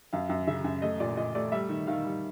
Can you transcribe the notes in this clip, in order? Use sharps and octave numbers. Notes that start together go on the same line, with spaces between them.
F#2 F5
F#2
C#3 E5
F#2
A3 D#5
A#2 D5
A#2 D#5
A3 D5
G3 E5
D#3
D#3 F5
G3